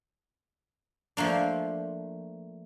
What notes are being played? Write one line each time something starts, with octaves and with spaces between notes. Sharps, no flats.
F3 A3 A#3 D4